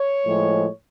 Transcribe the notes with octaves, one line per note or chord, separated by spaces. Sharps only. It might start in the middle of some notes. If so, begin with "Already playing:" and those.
Already playing: C#5
A2 F3 G#3